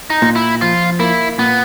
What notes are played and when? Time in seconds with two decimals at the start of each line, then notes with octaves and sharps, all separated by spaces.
0.10 D#4
0.22 A#2
0.36 E4
0.61 F3 F4
0.99 A#3 E4
1.39 A#2 B3